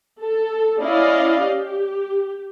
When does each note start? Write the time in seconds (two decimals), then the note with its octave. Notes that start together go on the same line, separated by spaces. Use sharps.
0.21 A4
0.81 C#4 E4 D5 D#5 F5
1.43 G4